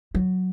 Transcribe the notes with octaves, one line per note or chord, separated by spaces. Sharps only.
F#3